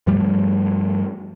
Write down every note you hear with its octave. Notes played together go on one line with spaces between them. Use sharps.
G2 F3 G3 A3